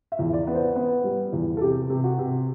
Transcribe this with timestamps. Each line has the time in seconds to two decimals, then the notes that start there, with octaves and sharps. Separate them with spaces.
0.12 E5
0.19 E2
0.33 D5
0.47 B3
0.54 C5
0.76 B3
1.04 G3
1.33 E2
1.57 A4
1.61 C3 G4
1.90 C3
2.04 F#4
2.18 C3